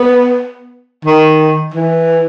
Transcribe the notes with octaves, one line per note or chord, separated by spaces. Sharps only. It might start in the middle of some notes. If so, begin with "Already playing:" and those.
Already playing: B3
D#3
E3